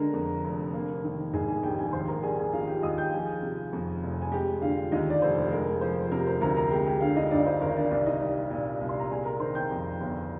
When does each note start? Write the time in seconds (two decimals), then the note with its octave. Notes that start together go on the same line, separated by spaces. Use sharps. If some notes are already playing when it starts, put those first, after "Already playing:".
Already playing: D3 G#3 A#4 A#5
0.13 F2
0.44 F1
0.74 A#3
1.04 D#3
1.33 G#2 G#4 G#5
1.48 G#4 G#5
1.63 A#1 G4 G5
1.78 G#4 G#5
1.93 D#2 C5 C6
2.08 A#4 A#5
2.22 G3 G#4 G#5
2.38 G#4 G#5
2.53 D#3 F4 F5
2.67 G4 G5
2.82 D#2 D#5 D#6
2.98 G5 G6
3.13 F3 G#4 G#5
3.42 C3
3.73 F2
4.03 F1
4.22 G#5
4.32 G#3 G4 G5
4.62 D3 F4 F5
4.92 D#2 D#4 D#5
5.10 D5
5.22 F1 C5
5.51 G#3 A#4
5.81 F3 C5
6.11 C3 A#4
6.27 C5
6.41 D2 A#4 A#5
6.56 A#4 A#5
6.71 G#3 G4 G5
6.86 G4 G5
7.01 D3 F4 F5
7.16 D#4 D#5
7.31 G2 D4 D5
7.46 C5
7.61 G#1 A#4
7.76 D4 D5
7.91 C2 D4 D5
8.06 D#4 D#5
8.21 G3
8.50 A#2
8.81 C2
8.89 C6
9.00 A#5
9.11 G3 G#4 G#5
9.25 A#4 A#5
9.40 D#3 C5 C6
9.55 G5 G6
9.71 F2
10.01 G1